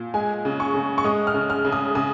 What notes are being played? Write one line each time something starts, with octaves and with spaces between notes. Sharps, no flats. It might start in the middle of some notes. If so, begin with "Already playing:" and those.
Already playing: A#2
G#3 G#5
C#3
C#6
C#3
C#6
G#3 D#6
F6
C#3
F6
C#3
D#6
C#3 D#6